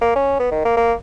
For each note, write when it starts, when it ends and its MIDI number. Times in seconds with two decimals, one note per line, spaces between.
0.02 0.15 58
0.16 0.38 61
0.40 0.49 59
0.51 0.65 51
0.65 0.75 58
0.77 0.93 58